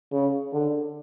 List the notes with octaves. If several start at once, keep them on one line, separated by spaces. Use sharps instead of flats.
C#3
D3